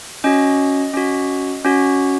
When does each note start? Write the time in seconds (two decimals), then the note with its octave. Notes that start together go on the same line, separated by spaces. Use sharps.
0.24 C#4 F#4 D#5
0.94 C#4 F#4
1.65 C#4 F#4